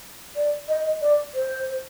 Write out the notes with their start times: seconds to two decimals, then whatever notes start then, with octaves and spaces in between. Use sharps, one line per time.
0.36 D5
0.68 D#5
1.01 D5
1.34 C5